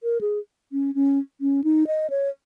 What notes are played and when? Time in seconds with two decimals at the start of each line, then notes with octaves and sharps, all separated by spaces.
0.03 A#4
0.21 G#4
0.72 C#4
0.95 C#4
1.41 C#4
1.64 D#4
1.87 D#5
2.10 C#5